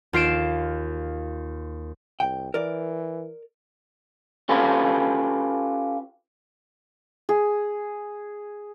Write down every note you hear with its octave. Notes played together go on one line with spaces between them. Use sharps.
D#2 F4 C7 D7 E7
C2 G5
E3 A#4 D5
C#4 F4 G4 A4 B4
G#4